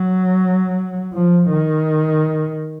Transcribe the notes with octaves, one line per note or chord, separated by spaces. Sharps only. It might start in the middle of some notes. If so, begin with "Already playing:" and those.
Already playing: F#3
F3
D#3